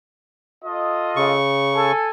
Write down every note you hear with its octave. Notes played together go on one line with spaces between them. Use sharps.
F4 A4 D#5
C#3 C#6
A4 G#5